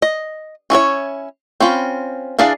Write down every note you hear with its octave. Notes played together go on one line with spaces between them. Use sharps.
D#5
C#4 E4 F4 C#5
C4 C#4 F4 B5
E3 D4 G#4 D5 F5